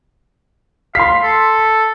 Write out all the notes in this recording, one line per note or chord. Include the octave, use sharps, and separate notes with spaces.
F5 C6 B6
A4